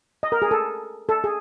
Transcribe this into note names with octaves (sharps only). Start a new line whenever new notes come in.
D#5
A#4
G#4
A4
A4
G#4